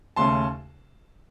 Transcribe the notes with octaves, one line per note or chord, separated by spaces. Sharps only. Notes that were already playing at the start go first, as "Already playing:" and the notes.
D#2 C#3 A3 C#4 A5 C6